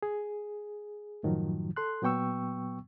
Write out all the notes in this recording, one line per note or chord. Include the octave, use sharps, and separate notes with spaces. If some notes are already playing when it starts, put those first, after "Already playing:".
G#4
F#2 A2 D#3 F3 F#3
A4 C6 F#6
A#2 F#3 B3 G5 C#6 E6